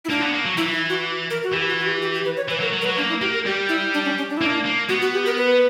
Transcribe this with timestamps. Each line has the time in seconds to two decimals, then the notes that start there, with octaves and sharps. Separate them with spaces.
0.05 E4
0.10 A#3 D4
0.22 B3
0.34 A#3
0.45 F#3
0.57 E3 E4
0.73 E4
0.89 F#4
1.30 A#4
1.44 F#4
1.53 E3 G4
1.69 F#4
1.79 F#4
1.86 G4
2.02 G4
2.14 G4
2.25 B4
2.37 C#5
2.49 E3 B4
2.61 F#3 A#4
2.73 F#3
2.82 A#4
2.85 F#3 B4
2.97 A#3 D4
3.09 E4
3.21 A#3 G4
3.34 A#4
3.46 G3 G4
3.69 E4
3.94 D4
4.05 C#4
4.17 C#4
4.30 D4
4.37 E4
4.41 A#3 D4
4.65 A#3
4.89 B3 F#4
5.02 F#4
5.14 G4
5.26 A#4
5.37 B4